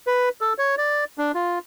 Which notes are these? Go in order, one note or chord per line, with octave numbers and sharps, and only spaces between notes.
B4
A4
C#5
D5
D4
F4